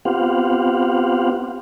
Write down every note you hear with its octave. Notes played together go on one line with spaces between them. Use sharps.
B3 C4 F4 G4 F5 F#5